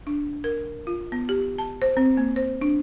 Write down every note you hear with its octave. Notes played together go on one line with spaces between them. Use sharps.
D4
A#4
F4
B3
G4
A5
C5
C4
A#3
C5
D4